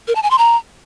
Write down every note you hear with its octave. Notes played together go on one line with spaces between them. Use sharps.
A#4
A5
G#5
C6
A#5